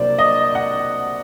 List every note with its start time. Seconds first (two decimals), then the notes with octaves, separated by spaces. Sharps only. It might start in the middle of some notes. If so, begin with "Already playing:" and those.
Already playing: C2 C3 F#3 A#3 D4 C5 D5
0.19 D#5
0.55 F#5